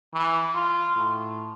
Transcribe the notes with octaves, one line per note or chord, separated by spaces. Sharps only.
E3
F4
A2